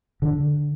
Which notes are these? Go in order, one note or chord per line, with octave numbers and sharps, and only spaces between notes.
D3